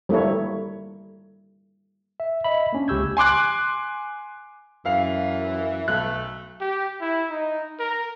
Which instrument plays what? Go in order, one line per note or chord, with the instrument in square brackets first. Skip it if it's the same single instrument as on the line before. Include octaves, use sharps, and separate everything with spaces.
[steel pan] G3 A3 A#3 E4 C#5
[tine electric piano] E5
D#5 E5 B5
A#3 C#4 D4
C#2 G4 C#6 E6 G6 G#6
[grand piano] G#5 C6 D6 F#6
[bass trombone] F#2 [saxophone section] E3 [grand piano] F5
[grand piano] B1 F#6 [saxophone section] A3
[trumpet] G4
E4
D#4
A#4